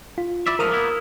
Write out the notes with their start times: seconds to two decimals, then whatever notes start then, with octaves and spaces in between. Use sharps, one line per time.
0.18 F4
0.47 E4 D5 E5
0.59 G#2 F3 A3 A#4 D#6 F6
0.71 A#3 B3 E4